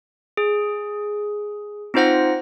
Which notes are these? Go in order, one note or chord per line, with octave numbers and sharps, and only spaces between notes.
G#4
C4 D#4 F4 C5 F#5 A#6